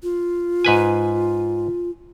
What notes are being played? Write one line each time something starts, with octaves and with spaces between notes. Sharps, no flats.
F4
G#2 B4 G#5